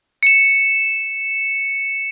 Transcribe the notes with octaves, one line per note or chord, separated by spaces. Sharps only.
C#7 E7